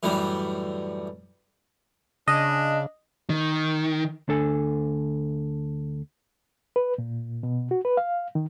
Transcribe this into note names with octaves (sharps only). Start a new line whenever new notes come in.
F#2 A2 E3 G3
C#3 D4 D#5
D#3
D2 D4 A4 G#5
B4
A#2
B2
F#4
B4
F5
D#3